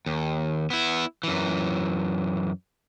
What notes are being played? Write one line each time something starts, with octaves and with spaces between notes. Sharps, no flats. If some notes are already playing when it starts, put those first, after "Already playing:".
D#2
B3 E4
F#2 E3